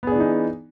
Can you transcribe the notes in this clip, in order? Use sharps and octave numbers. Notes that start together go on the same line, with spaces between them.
E3 B3 D4 D#4 G#4